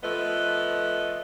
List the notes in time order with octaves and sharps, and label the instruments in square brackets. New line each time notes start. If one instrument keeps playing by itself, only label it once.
[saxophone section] F3 A3 B3 B4 D#5